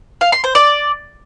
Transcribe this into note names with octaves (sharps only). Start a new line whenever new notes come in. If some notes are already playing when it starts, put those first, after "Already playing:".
F5
C6
C5
D5